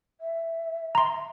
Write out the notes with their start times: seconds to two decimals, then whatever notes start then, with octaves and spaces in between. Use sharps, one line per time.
0.21 E5
0.95 A#5 C6